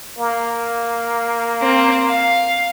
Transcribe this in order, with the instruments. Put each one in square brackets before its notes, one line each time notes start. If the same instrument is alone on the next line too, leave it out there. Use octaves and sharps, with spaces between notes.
[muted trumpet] A#3
[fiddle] C4
F5